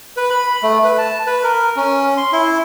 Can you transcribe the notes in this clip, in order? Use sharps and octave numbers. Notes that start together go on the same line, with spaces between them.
B4
B5
A3
B4
A5
B4
A#4
C#4
C6
E4